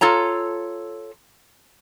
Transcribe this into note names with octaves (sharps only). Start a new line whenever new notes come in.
F4 A4 C#5 A#5